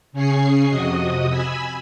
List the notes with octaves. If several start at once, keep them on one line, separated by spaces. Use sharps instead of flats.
C#3 C#4 G#4 G#5 C#6 C7
F2 C3 F#4 D#5 D#6
G#5 B5 E6